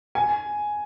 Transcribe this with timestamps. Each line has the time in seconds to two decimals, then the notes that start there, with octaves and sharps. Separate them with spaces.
0.15 G#5